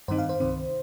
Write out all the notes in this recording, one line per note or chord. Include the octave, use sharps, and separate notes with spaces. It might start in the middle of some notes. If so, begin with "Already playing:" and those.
G2 D#3 C4 D#4 C5
F5
C5
C2 C3 D#3 C4